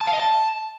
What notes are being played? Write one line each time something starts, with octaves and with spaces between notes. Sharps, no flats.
A5
F5
D#5
A5